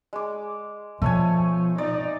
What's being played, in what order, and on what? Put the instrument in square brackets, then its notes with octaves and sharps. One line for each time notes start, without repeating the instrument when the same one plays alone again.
[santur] G#3 D6
[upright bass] B2 [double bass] F3 [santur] A3 C#5 G#5
[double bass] D#4 [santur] D5